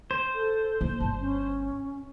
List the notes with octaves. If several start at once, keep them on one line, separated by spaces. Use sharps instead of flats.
C5
A4
A#3
G1 A5
C#4